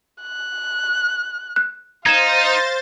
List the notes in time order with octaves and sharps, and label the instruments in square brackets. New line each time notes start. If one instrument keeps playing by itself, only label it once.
[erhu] F#6
[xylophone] F#6
[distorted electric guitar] D#4 [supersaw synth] C5 A6 [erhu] F5 [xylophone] G#6 E7